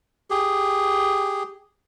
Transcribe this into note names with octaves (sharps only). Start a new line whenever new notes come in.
G4 G#4